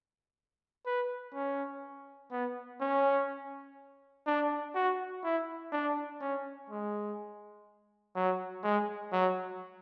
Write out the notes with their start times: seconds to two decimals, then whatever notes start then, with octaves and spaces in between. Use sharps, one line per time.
0.86 B4
1.34 C#4
2.31 B3
2.81 C#4
4.26 D4
4.75 F#4
5.24 E4
5.72 D4
6.20 C#4
6.70 G#3
8.15 F#3
8.63 G#3
9.13 F#3